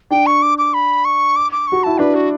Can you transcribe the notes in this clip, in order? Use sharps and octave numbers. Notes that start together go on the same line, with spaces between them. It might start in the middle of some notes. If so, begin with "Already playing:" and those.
D4 G5
C#6
D6
D6
B5
C#6
D6
D6
F#4 C#6
E4 A5
D4 B4
F#4